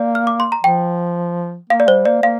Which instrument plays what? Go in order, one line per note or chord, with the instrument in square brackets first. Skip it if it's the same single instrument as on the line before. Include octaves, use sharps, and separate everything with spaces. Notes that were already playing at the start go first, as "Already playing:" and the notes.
Already playing: [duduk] A#3 [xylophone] D5
[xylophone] F6
D6
C6
A#5
[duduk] F3 [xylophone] G5
[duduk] A#3 [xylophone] F5
[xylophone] D5
[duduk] G3 [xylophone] C5
[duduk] A#3 [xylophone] D5
[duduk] A#3 [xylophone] F5